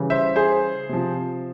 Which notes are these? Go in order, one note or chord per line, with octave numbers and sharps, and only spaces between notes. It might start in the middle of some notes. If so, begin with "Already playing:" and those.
Already playing: C#3 E3 G3
C5 E5
G#4 C5
C3 F3